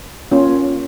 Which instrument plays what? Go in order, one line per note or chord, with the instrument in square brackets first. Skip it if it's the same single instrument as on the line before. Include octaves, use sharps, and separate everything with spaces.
[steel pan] A#3 C#4 F4